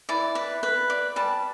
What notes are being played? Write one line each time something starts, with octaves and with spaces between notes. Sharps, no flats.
E3 D5
B4
B4
D5
G3 A5